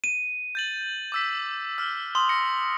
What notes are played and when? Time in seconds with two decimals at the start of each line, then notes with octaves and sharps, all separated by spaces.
0.04 D#7
0.55 G6 A6 F#7
1.12 D6 E6 B6
1.78 E6 F6
2.15 C6 D#6 F#7
2.29 A#6 C#7